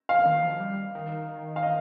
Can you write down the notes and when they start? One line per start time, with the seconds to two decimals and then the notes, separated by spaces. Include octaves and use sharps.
0.09 F5
0.26 D#3
0.43 F3
0.60 G3
0.95 D#3
1.56 F5
1.63 D#5